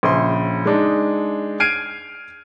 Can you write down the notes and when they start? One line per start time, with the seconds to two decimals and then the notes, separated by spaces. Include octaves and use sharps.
0.03 A#1 C#3 C6
0.66 G#3 D4 D#4
1.60 F6 G#6 C7 D7 D#7